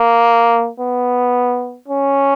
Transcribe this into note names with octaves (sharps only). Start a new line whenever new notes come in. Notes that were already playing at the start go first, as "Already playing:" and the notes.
Already playing: A#3
B3
C#4